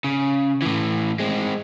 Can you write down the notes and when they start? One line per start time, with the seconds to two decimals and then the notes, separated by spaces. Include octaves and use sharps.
0.04 C#3
0.62 A2 E3
1.19 G#3 C4